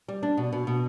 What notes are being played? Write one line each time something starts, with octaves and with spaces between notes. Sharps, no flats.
G3
D4
B2
B2
B2